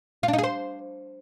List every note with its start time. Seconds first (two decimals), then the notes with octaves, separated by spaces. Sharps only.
0.23 F4
0.28 D4
0.33 D#4
0.38 G#4
0.44 C5